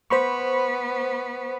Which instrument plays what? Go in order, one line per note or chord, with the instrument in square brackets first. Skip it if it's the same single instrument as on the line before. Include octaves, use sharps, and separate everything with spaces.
[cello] B3 [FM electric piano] C5 B5 C#6